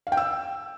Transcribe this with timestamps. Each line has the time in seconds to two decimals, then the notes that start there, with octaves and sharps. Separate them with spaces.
0.07 F5
0.12 G5
0.17 E6